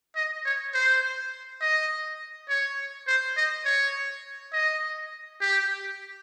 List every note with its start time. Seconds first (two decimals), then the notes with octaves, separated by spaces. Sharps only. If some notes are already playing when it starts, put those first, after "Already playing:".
0.16 D#5
0.45 C#5
0.74 C5
1.61 D#5
2.49 C#5
3.07 C5
3.37 D#5
3.65 C#5
4.53 D#5
5.41 G4